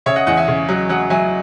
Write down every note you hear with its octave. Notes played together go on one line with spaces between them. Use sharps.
C#3 C#5 E5
D#5 F#5
E2 D#5 F#5
E5 G#5
C#3
F#3
F#3 D#5 F#5
F#3 E5 G#5